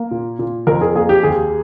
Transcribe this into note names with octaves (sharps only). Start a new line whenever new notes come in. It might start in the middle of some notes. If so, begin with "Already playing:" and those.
Already playing: A#3
A#2
A#2
F2 A#4
G#4
A#3 G#4
G4
D#2 G#4